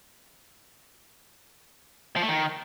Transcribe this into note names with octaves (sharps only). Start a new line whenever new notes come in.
F3
A3
D#3